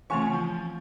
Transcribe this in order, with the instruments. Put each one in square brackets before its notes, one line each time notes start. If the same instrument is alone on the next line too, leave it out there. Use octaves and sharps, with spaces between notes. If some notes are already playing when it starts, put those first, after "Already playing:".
[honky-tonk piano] C#3 C#6 [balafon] E3 A3 C4 [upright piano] F4 G#5 C6
[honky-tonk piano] F3